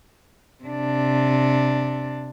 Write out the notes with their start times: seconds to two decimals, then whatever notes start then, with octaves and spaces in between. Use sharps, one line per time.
0.64 C3 D4